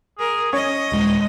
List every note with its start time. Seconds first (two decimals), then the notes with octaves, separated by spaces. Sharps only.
0.19 G#4 A#4
0.53 C#4 C#5 D#5
0.92 D#1 G#3